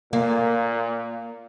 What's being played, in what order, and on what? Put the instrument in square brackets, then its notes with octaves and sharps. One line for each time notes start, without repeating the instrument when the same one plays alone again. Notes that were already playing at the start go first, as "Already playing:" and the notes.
[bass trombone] A#2 [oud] A#3